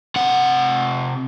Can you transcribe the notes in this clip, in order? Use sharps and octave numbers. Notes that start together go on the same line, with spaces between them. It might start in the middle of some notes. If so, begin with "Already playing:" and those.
C3 F#5